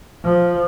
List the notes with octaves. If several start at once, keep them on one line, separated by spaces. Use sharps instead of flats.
F3